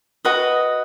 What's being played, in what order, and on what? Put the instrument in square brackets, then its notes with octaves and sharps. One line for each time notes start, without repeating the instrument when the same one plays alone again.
[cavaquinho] F#4 B4 D#5